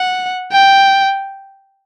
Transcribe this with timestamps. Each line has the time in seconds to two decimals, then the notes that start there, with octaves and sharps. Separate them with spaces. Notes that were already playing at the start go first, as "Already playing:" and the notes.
Already playing: F#5
0.52 G5